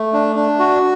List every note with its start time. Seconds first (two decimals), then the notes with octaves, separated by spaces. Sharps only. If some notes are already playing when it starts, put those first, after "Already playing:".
Already playing: A3
0.13 D4
0.36 D4
0.59 F#4